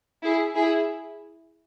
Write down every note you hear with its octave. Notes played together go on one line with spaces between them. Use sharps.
E4 G#4
E4 G#4